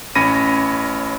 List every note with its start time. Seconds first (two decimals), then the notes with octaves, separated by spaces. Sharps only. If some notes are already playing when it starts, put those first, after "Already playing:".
0.15 A1 C#4 C#5 B5 A#6 D#7